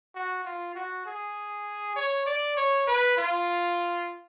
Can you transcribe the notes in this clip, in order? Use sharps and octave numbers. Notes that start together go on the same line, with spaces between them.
F#4
F4
F#4
G#4
C#5
D5
C#5
B4
F4